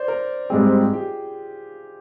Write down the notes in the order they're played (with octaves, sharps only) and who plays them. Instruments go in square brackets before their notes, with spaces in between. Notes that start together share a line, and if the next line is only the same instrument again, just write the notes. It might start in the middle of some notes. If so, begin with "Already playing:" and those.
Already playing: [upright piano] C5 D5
A#4
[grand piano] G#2 G3 C4 [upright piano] G#4
[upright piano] G4
F4
G4